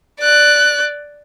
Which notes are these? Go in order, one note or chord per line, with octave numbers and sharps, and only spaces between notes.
D5 F#6